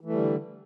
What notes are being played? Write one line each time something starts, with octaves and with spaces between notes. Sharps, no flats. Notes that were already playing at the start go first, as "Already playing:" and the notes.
D3 E3 G3 A3